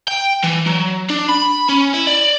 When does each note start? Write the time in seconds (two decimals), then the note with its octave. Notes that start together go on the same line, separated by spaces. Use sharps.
0.08 G5
0.44 E3
0.66 F#3
1.10 D4
1.29 B5
1.69 C#4
1.94 E4
2.07 D5